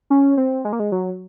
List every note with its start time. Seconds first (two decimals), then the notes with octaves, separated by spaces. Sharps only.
0.10 C#4
0.37 C4
0.65 G#3
0.73 A#3
0.80 G#3
0.92 F#3